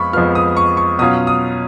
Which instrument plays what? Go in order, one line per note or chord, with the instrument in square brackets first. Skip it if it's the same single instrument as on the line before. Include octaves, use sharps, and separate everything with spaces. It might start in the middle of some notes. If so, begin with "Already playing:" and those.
Already playing: [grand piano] F2 F3 G#3 B3 F4 B5 C#6
F2 F3 G#3 B3 F4 F6
D#6
C#6
C#6
B2 F#3 C#4 F4 D#6
D#6